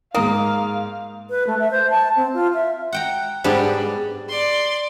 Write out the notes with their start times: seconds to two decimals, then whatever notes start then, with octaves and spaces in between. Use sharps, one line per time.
0.15 G#2 A#3 F5 D#6
1.30 B4
1.47 A3
1.59 E5
1.71 C5
1.90 A5
2.16 C4
2.34 F4
2.54 E5
2.92 F#5 G5 A#5
3.44 G#2 G3 B3 D4 G4
4.29 D5 C6